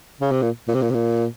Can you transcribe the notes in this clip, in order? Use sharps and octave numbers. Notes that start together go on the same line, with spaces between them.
C#3
C3
A#2
A#2
C3
A#2
C3
A#2